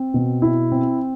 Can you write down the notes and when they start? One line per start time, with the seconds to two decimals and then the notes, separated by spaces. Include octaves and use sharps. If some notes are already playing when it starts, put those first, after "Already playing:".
Already playing: C4
0.14 B2
0.42 E4
0.72 C4